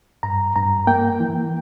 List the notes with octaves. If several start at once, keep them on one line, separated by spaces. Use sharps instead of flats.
G2 A#5
G2 A#5
A#3 G5
E3